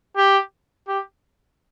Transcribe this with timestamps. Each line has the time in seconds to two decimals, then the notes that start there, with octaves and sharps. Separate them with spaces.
0.17 G4
0.88 G4